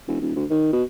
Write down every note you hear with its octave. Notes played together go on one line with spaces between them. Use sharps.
E1
D#1
D2
D#3
B2